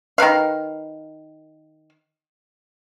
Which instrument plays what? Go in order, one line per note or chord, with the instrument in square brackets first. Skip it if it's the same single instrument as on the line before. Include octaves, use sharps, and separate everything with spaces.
[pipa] D#3 A#4 B4 F5